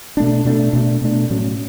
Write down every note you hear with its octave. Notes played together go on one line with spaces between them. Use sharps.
B2 A3 D4
B2 A3 D4
B2 A3 D4
B2 A3 D4
A2 F#3 C#4